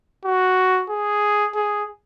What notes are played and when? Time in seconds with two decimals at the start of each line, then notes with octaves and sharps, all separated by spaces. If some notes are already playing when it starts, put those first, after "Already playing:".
0.25 F#4
0.90 G#4
1.55 G#4